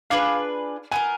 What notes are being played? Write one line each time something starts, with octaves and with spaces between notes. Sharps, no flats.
D4 F4 G#4 B4 F5
B3 F4 A#4 G#5